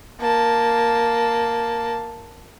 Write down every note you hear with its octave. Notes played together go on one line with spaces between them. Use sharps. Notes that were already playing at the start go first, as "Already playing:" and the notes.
A#3 A5